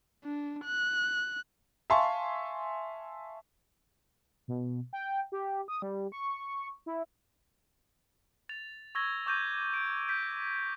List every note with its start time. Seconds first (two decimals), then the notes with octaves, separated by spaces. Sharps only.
0.24 D4
0.65 F#6
1.90 E5 F5 G#5 A5 C6 C#6
4.48 B2
4.93 G5
5.32 G4
5.68 D#6
5.82 G3
6.12 C#6
6.86 E4
8.49 A6 F7
8.95 C#6 E6 G#6 A#6 G7
9.26 C#6 D6 G6 A#6 D#7
9.74 D7
10.09 G6 B6